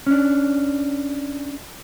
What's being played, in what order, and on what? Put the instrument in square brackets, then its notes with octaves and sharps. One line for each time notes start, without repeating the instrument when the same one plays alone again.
[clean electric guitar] C#4 D4